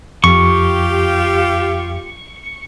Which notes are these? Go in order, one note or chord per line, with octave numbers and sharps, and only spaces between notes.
F2 F4 G4 C#6